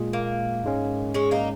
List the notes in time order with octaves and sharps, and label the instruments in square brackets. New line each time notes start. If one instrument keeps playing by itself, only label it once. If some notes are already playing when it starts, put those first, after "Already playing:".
Already playing: [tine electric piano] A#2 G#3 F4 G#4
[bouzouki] A#3
[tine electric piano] G#2 G#3 C#4
[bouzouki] G#3 C#4
A#3 D#4